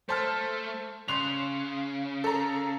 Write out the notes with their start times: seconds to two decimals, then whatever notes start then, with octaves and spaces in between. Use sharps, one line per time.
0.09 A3 C5 A5 F6
1.08 C#3 C6 F#6 F7
2.24 A4 A#5